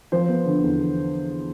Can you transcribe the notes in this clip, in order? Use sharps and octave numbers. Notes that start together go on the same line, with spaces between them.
F3 C5
B3
D3
E2